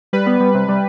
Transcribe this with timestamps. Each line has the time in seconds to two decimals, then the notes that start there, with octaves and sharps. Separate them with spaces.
0.13 G3 B4
0.26 B3
0.40 G3
0.54 C3
0.69 G3